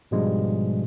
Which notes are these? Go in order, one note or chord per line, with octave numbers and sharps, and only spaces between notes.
G#2 B2 F3 G3 G#3 D4